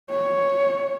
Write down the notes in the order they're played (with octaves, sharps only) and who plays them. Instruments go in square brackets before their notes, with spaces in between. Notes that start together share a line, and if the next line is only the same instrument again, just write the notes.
[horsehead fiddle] C#5